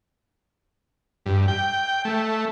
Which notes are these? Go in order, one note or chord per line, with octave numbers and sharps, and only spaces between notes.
G2
G5
A3